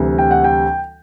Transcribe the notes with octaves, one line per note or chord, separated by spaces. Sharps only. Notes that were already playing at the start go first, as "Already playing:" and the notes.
Already playing: D2 C3 E3 G3
G5
F#5
G5